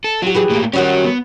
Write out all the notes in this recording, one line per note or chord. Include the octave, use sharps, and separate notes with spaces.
A4
F#3 F4 G4
E3 G4 G#4
A2 A#3
D#3 F#3 G3 C#4 F#4
B3